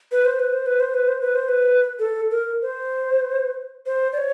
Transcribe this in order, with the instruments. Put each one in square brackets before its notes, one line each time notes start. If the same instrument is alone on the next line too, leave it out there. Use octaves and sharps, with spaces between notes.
[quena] B4
C5
B4
C5
B4
C5
B4
C5
B4
C5
B4
A4
A#4
C5
C5
D5
C#5